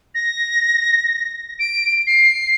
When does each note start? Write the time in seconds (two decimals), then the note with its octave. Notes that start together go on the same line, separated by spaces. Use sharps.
0.15 A#6
1.59 D7
2.07 C7